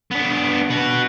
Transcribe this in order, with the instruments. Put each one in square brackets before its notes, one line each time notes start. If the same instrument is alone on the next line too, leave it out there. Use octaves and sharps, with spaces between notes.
[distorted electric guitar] B3 D4
F#4 B4